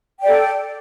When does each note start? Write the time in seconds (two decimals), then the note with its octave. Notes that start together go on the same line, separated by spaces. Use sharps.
0.21 G5
0.24 D5
0.27 A4